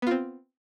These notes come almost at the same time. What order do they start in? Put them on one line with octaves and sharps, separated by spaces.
B3 F4 C4